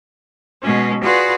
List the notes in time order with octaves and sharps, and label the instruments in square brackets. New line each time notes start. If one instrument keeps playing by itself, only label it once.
[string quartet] B2 G#3 C#4
F4 F#4 G#4 B4 D5